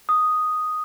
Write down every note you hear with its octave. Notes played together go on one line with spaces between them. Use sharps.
D#6